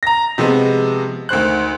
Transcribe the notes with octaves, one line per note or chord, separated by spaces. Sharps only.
A#5 A#6
C3 F3 G#3 B3
D2 D#3 C5 F#6